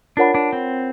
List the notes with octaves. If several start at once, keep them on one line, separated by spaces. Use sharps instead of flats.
D4 F4 A#4 C#5 F#5 B5
D4
C4